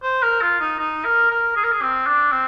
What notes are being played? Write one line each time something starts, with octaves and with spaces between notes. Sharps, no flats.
C5
A#4
F4
D#4
D#4
A#4
A#4
G#4
A#4
G#4
C4
D4
C4